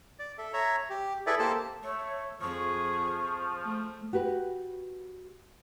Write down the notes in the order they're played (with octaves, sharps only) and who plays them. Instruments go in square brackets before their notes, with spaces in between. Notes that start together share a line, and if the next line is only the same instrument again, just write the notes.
[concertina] D5
A4 E5
C#5 E5 A#5
G4
E4 G#4 A4 B4 D5 E5
A#3 G4 A4 C5 A5
[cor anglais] A3 [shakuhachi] C#5
[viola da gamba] F2 G#4 [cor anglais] F3 [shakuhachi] C#6
[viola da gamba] A3
[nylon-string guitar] F#4 G4 B4